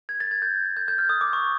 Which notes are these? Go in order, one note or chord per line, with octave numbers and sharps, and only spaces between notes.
G#6
A6
G#6
G6
G6
G6
F6
D#6
D6
C#6